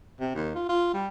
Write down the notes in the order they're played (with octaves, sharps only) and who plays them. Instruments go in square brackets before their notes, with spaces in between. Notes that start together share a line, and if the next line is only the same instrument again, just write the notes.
[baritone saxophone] C3
D#2
F4
F4
G3